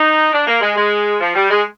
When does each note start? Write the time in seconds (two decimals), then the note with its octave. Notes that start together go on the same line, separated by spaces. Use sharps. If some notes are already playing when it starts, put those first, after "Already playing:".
Already playing: D#4
0.33 D4
0.47 A#3
0.62 G#3
0.76 G#3
1.21 F3
1.35 G3
1.50 G#3